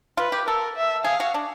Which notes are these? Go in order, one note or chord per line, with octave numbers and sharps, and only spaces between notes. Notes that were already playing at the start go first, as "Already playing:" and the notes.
F4 B4
G4
A4 A#4
E5
G#4 F5
F#4
D4